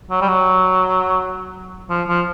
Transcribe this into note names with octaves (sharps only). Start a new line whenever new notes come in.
F#3
G3
F#3
F3
F3